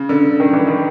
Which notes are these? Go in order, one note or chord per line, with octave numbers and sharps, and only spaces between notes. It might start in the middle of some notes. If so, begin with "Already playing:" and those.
Already playing: C#3
D3
D#3
E3
D#3